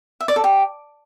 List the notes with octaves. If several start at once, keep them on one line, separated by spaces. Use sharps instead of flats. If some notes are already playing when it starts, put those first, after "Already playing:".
E5
D5
A4
G4